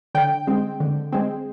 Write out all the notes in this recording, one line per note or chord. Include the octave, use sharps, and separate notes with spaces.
D3 G5
G#3 C4
D3
G#3 C4